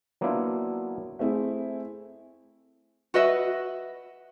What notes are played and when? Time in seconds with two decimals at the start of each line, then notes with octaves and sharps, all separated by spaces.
0.21 F#3 A#3 B3 D4 E4 F4
1.19 A3 C4 E4 G#4
3.14 F#4 B4 D#5 E5